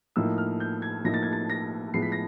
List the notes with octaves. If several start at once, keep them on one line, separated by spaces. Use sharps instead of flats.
A2 F3 A#3 D#4 E6
F6
G6
G#6
A2 F3 A#3 D#4 A#6
A6
G#6
A6
A#6
A2 F3 G#3 B3 C7
B6
A#6